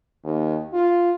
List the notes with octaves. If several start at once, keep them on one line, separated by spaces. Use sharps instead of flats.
D#2
F4